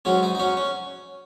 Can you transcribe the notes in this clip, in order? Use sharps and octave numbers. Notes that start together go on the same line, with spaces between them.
G#2 F#3 C#4 F#4
D#4
D#4
C#4 F#4
C#4